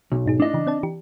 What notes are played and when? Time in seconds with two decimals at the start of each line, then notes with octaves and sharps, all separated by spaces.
0.12 B1
0.26 G#2 D#4 G#4
0.40 A3 D4 E4 D#5
0.54 C#3 E3
0.67 C4 D5 A5
0.83 E3 G4